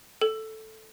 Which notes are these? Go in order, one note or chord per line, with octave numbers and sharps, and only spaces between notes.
A4